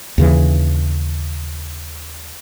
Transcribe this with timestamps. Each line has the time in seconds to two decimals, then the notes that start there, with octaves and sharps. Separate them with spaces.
0.18 D#2 C#3 E3